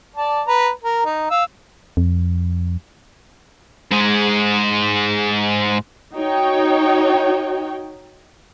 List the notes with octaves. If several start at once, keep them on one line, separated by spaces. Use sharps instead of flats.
D5 A5
B4 A#5
A#4
D#4
F5 E6
F2
G#2 G#3
D#4 F#4 C#5 G5